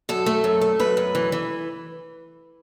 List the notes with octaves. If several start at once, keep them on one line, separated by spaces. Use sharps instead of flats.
F#2 A4
A3
F#2
A3
F#2 B4
F#2
E3
E3